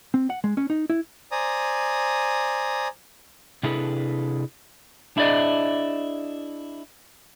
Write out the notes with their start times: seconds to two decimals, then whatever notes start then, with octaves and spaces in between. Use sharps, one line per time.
0.14 C4
0.30 F#5
0.44 G#3
0.57 C#4
0.70 D#4
0.90 E4
1.32 C5 D5 G#5 A#5 D#6
3.63 C3 D4 E4 G#4 A4 B4
5.17 D4 E4 G#4 D5 D#5